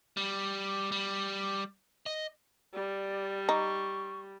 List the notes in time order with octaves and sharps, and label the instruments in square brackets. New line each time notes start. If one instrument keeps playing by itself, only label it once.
[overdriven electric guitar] G3
G3
D#5
[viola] G3 [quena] D5
[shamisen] D#4 [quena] C#6